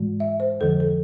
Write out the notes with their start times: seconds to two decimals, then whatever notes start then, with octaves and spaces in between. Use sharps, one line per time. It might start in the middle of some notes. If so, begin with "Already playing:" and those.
Already playing: G#2 E3 G#3
0.20 E5
0.40 C5
0.60 F2 D3 F3 A4
0.80 A4